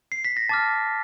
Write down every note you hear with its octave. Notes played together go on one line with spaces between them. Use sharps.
C7
B6
A#6
A5 D6 F6 A6